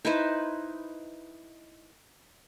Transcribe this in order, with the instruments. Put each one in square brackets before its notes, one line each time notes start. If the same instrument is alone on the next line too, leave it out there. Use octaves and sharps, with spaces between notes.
[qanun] D#4 E4 B4 C5